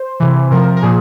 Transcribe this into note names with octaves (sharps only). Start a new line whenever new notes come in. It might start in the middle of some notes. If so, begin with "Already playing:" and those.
Already playing: C5
C3 E3
C3 F3 A#4
A#4
A#2 F3 G#4